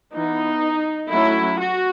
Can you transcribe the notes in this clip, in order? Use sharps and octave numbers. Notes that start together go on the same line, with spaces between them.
E3 B3 D#4
F#3 A3 C#4 E4
F#4